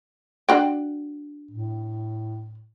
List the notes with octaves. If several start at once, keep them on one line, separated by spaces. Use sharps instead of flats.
D4 F#4 G5
A2